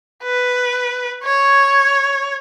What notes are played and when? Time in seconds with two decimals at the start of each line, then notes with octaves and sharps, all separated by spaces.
0.24 B4
1.24 C#5